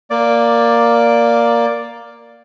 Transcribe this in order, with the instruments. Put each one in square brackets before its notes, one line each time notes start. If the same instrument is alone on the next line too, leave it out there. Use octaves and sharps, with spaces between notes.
[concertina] A#3 D5